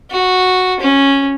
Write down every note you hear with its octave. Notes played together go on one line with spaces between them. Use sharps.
F#4
C#4